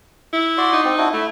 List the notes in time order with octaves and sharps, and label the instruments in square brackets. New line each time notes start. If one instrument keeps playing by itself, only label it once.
[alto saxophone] E4
[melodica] F#4 D5 C6
[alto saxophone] D#4
[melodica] C4
D4 E4 F#4
[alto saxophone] A3 [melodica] E4